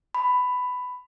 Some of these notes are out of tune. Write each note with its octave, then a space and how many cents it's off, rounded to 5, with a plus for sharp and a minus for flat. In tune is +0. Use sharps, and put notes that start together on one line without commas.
B5 +15